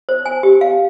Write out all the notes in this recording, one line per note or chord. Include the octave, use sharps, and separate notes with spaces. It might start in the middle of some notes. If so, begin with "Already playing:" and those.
C5
G#5
G4
F5